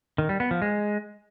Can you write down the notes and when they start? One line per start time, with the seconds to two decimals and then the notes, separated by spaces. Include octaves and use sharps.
0.18 D#3
0.29 G3
0.40 B3
0.51 F3
0.62 G#3